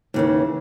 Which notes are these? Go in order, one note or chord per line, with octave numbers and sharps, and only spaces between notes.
D#2 C#3 E3